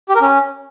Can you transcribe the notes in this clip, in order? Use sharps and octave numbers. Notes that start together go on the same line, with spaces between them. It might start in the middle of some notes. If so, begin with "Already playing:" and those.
G4
A#4
C#4